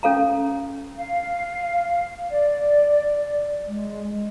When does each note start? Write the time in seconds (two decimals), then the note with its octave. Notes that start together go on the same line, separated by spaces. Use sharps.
0.03 C#4 A4 F5 A#5
0.98 F5
2.31 D5
3.67 G#3